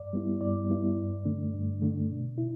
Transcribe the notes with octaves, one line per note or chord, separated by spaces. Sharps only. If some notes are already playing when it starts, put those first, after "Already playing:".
Already playing: G2 D5
G3 B3 E4
G2 D5
G3 B3 E4
G2
D3 A3 D4
G2
D3 A3 D4
B2
E4